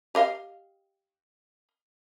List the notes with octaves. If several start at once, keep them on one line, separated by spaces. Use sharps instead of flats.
G4 D#5 F5